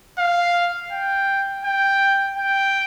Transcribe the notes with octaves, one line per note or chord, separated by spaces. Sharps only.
F5
G5
G5
G5